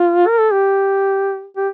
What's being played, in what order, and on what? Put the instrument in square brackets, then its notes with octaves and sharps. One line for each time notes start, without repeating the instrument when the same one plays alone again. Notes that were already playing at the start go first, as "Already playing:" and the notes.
Already playing: [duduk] F4
A#4
A4
G4
G4